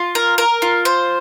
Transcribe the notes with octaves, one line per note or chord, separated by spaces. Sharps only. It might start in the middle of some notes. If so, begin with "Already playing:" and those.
Already playing: F4
A#4
A#4
F4
C5